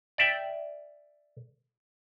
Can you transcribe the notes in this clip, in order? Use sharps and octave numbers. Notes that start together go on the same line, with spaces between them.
D5 E5 G5